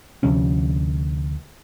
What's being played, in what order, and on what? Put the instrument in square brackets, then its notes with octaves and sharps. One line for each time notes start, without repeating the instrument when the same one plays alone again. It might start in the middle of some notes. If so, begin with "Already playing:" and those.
[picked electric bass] D2 C3 F3 C#4